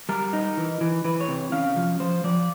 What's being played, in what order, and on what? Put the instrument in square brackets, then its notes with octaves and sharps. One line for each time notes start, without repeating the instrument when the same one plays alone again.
[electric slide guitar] G3 A#4
D#4
E3
E3
E3 B4
C#5
C3
C#4 F5
F3
F3 C5
F3 D5